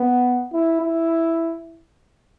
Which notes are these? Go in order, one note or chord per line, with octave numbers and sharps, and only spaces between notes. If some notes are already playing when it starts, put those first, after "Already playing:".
Already playing: B3
E4
E4